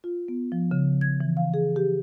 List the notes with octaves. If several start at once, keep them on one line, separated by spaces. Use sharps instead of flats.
F4
B3
F3
C#3
G#6
E3
F5
G#4
G4